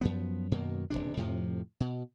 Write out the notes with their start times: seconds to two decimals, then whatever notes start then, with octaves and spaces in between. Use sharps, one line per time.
0.01 F#2 F3 B3
0.51 F#2 B2 D#3 A#3
0.90 D#1 B1 C3 D4
1.17 F2 A2 C3 F3
1.80 B2